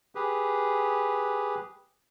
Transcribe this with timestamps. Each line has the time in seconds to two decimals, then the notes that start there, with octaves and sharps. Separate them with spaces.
0.15 G4 G#4 B4